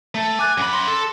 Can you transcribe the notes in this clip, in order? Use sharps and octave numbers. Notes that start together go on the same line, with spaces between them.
A3
G#5 D6 F#6 A6
F#2 B5 D6
C6 A#6
A4